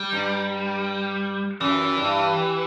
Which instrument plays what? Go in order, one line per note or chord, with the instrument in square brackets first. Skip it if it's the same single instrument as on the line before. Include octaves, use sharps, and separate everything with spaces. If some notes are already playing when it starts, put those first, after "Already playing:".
Already playing: [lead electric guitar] G3
[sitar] G2
[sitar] F#2 [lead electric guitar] E3
[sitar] G2